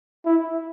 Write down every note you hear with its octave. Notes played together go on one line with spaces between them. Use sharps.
E4